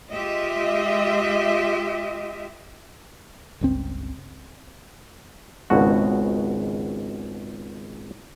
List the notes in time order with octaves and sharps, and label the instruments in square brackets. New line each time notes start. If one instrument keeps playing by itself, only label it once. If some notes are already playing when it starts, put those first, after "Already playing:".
[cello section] G#3 F4 G4 D#5 E5
[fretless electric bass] G1 C#2 C4
[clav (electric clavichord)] G#1 C#2 B2 F#4